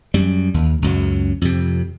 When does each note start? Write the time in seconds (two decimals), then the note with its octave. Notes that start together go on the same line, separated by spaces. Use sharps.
0.14 F#2 G3
0.54 D#2
0.82 C#2 F#2 F#3
1.42 F2 C3